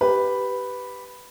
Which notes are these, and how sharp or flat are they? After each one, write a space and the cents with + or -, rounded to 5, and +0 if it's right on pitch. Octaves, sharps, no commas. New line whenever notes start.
G4 -10 B4 +0